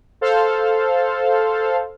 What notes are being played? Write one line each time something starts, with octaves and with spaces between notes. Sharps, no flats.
A4 C5 F5